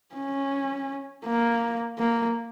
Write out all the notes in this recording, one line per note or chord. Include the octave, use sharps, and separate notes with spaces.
C#4
A#3
A#3